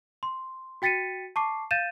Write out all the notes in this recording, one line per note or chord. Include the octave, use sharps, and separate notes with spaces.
C6
F#4 G5 A6 B6 C#7 D#7
A5 C#6 D6 C7
F5 G6 A6 D#7 E7